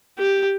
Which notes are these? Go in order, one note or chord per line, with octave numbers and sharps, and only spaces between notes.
G4